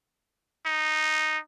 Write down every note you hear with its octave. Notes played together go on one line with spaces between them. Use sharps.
D#4